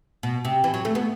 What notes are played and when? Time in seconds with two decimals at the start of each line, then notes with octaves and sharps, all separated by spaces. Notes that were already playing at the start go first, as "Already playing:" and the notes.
0.23 B2
0.45 C3
0.64 E3
0.74 F#3
0.85 A3
0.95 B3